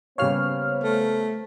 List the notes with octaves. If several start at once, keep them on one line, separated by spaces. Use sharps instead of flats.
C#3 G3 A#3 B3 C5 C#5 F5 F6
A3